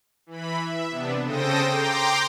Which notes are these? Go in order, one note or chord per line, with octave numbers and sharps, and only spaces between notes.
E3 B5
E5
C3 B3 D4
C#3 A4 C5 G5 D#6 A#6
G5 A#5 C6 D6